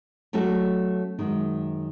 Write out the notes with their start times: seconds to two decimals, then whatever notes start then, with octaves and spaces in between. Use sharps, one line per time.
0.33 F#3 A3 C#4 F#4 A4
1.19 F#2 D#3 G#3 D#4 F#4